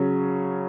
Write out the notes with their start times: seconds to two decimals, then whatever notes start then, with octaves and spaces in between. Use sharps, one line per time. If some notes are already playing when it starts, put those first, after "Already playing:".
Already playing: C#3 F#3 C#4